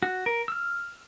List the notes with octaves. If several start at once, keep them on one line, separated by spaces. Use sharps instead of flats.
F#4
A#4
E6 F6